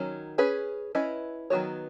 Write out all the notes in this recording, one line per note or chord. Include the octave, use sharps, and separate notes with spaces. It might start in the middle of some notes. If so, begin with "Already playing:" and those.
Already playing: D#3 F#3 C#4
C#4 G#4 B4
C#4 E4 B4 D#5
D#3 F#3 B3 F#4 C#5